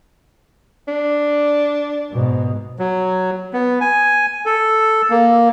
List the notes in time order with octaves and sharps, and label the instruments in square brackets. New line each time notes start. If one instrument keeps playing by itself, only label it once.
[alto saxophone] D4
[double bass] G#2 B2
[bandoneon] F#3
B3
G#5
A4
A#3